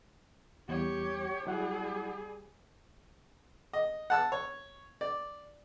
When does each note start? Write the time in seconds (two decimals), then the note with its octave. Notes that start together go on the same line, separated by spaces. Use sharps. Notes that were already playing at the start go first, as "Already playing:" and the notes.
0.69 E2 G3 G4 C#5
1.47 F#3 G3 E4 G#4 F#5
3.73 D#5
4.10 F#5 A5 E6
4.32 C#5
5.01 D5